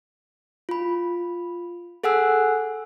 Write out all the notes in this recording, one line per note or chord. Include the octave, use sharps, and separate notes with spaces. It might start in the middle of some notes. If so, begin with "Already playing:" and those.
F4 B5
G#4 A4 F#5 G#5 E6 F#6